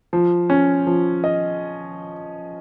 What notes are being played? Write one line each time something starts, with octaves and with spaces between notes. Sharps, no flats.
F3
C#4
F3
D#5